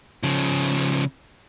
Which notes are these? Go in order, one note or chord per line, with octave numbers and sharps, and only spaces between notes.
C#3 F3